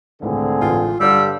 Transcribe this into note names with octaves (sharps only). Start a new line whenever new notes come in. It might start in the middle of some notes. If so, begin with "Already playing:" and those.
C#2 A2 D3 D#3 C4 G#4
A1 G#3 F4 G5
G2 D3 G3 C#5 F5 E6